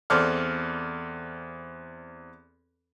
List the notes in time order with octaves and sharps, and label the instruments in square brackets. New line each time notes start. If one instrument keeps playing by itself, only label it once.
[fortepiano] E2 C4 A4 D5 D6 F6